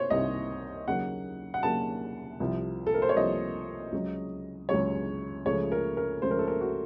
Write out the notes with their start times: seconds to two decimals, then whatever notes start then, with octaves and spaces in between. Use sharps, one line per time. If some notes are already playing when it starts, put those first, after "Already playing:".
Already playing: C3 D#3 C5 C#5
0.10 C2 C3 D#3 D#5
0.87 D#2 C#3 F#3 A#3 F#5
1.54 F#5
1.63 D#2 C#3 F#3 A#3 A5
2.40 C2 C3 F3
2.87 A4
2.94 A#4
3.02 C5
3.09 C#5
3.16 C2 C3 F3 D#5
3.92 C#2 C#3 F#3
4.69 C#2 C#3 F#3 C#5
5.46 C#2 C#3 F3 A3 C#5
5.72 A#4
5.97 A#4
6.22 C#2 C#3 F3 A3 C5
6.31 A#4
6.39 A4
6.47 A#4
6.61 F#4